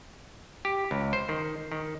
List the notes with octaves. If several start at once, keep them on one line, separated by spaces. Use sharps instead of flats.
G4
C#2
C5
D#3
D#3